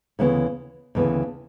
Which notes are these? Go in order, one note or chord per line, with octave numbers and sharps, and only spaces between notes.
D2 C#3 E3 B3
D2 C#3 E3 B3